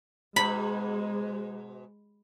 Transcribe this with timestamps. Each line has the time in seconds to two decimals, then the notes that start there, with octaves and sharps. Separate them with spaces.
0.36 G#2 B2 G#3 B5